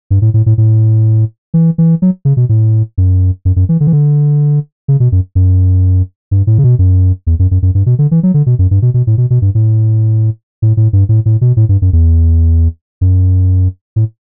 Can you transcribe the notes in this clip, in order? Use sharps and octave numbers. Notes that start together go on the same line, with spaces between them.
G2
A2
A2
A2
A2
E3
E3
F#3
C#3
B2
A2
F#2
F#2
F#2
E3
D3
E3
D3
C#3
B2
F#2
F#2
G2
A2
C#3
B2
F#2
E2
F#2
F#2
F#2
G2
B2
D3
E3
F#3
D3
B2
F#2
G2
B2
B2
A2
B2
B2
G2
A2
A2
A2
G2
A2
A2
B2
A2
G2
F#2
E2
F#2
A2